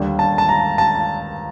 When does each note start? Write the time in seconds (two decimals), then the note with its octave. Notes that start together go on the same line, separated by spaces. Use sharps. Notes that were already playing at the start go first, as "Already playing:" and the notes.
Already playing: D#2 D3 G3
0.19 A5
0.38 A5
0.49 A#5
0.78 A5